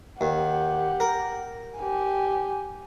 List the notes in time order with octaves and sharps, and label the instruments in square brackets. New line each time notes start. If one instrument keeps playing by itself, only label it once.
[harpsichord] D#2 [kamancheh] G4 F#5
[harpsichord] A#4
[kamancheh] G4 G#5